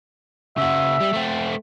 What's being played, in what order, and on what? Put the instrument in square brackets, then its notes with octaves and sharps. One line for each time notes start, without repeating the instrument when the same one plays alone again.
[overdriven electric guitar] C#3 F#4 [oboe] E5
[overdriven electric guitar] G3
A3 C4